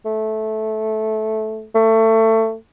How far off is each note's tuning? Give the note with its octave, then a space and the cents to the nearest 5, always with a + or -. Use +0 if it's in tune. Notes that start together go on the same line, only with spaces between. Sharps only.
A3 -15
A3 +25